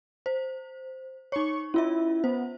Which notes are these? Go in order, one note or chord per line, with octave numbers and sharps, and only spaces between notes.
C5
D#4 C#5 C#6
C#4 E4 F4 E5
B3 C5